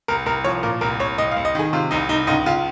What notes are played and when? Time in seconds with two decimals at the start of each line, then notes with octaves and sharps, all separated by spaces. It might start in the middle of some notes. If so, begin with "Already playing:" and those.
0.08 C2 A#4
0.26 C2 A#4
0.44 F3 C#5
0.63 A#2 A#4
0.81 C2 A#4
1.00 C2 C#5
1.18 C2 D#5
1.31 F5
1.37 C2
1.45 D#5
1.55 D#3 G#4
1.73 C3 F4
1.91 C2 D#4
2.09 C2 D#4
2.27 C#2 D#4
2.46 C#2 F4